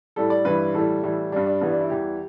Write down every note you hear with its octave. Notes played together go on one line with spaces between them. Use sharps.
A2 G3 A4
D5
G2 E3 G3 B4
A2 E3 G3 A4
A2 E3 G3
G2 G3 D4
D4
G2 E3 G3 B3
D4
E4
E2 E3 G3 G4